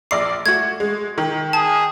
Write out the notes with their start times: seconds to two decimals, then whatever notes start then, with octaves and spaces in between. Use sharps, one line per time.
0.11 A#1 D5 D6 C7
0.46 A3 F#4 G#6
0.80 G#3
1.18 D#3
1.53 G#4 A5